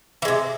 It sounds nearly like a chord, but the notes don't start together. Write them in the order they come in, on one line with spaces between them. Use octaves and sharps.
E3 G#3 C3